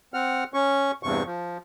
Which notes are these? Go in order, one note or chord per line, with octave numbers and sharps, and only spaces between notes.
C4 F#5 F6
C#4 C#6
E2 G2 C3 C#6
F3